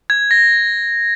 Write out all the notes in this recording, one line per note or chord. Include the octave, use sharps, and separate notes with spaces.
G#6
A#6